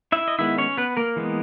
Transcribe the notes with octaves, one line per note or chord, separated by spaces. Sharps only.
E4 E5
D#5
D#3 G#3 B3 E4 E5
C#4 C#5
B3 B4
A#3 A#4
E3 G#3 B3